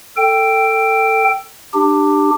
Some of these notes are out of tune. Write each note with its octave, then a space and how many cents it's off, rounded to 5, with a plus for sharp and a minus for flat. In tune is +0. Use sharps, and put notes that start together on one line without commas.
A4 +15 G5 +0
D4 +25 G4 +5